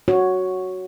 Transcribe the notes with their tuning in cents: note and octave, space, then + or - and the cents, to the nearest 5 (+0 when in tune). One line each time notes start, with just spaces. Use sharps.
F#4 +0 C#5 +0